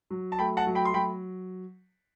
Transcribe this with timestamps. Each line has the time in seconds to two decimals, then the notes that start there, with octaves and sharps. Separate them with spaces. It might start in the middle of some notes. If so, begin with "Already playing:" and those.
0.10 F#3
0.32 A5
0.39 A3 G5 B5
0.57 F#5 A5
0.67 F#3
0.75 G5 B5
0.85 C6
0.94 F#3 G5 B5